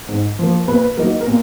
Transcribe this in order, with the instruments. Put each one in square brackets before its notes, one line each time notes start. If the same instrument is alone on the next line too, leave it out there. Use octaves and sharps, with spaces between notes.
[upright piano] G#2
F3 A#3
A#2 B4
F#3 A#3 D#4 A#4
A#4
A#2